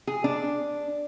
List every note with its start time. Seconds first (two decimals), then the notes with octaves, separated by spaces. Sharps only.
0.07 G#4
0.24 D4